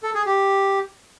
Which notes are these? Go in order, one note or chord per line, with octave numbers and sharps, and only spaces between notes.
A4
G#4
G4